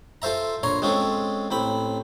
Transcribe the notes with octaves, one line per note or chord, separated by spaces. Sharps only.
F4 A4 C5 E5 A#5
A#1 C#5 A#5 C6
G#3 C4 C#4 F4 A4
A1 C4 B5